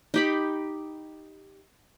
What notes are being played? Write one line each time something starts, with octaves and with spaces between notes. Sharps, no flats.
D#4 G4 B5